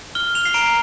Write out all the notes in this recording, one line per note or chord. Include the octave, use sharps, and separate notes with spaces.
F6 G7
F7
C7
A#5 D7